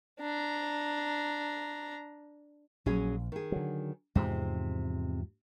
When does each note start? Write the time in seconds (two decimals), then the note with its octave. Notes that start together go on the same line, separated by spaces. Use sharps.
0.20 D4 A#5
2.86 A#1 F#3 C#4 G#4
3.32 D#3 G#4
3.52 D3 F#3
4.15 E2 G#2 C3 F3 G#3 C4